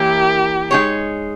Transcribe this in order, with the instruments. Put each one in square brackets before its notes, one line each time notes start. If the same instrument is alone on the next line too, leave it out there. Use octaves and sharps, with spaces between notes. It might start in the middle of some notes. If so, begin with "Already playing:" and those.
Already playing: [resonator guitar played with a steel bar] E3 A#3 E4 A#4 C#5 [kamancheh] G4
[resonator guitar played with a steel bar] G#3 D#4 G#4 C#5